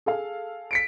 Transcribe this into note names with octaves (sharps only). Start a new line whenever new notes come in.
G#4 A4 F5
B6 C#7 D7